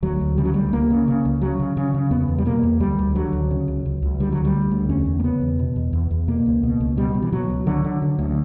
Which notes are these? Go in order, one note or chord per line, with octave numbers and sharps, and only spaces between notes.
D2 F#3
D2
C#3 G3
F#3
D2 G3
C#2 A#3
C#3
C#3
C#2
C#3 F#3
C#3
C#3
C#3
E2 B3
E2
G3
B2 A#3
E2
D2 G3
D2
D3 F#3
D2
C#3
C#2
C#2
C#2
D3 G3
D2 F#3
G3
D2
D2
E2 C#4
E2
A#3
C#3 B3
E2
B2
E2
E2
E2
B2 A#3
C#2
B2
C#2
B2 G3
B2
E3
B2 F#3
C#2
D3 F#3
D3
D3
D2